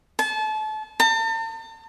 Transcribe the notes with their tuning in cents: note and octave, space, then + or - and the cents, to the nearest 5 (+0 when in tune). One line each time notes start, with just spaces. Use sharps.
A5 -30
A5 +40